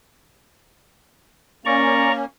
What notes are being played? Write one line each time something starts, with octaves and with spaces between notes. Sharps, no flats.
A#3 C#4 D5 A#5 C#6